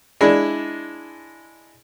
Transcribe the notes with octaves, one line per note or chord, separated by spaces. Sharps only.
G#3 D4 E4